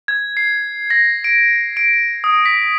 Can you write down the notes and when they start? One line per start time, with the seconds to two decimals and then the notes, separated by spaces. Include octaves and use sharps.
0.08 G#6
0.37 C7
0.90 A#6
1.24 D7
1.77 D7
2.24 D#6
2.46 B6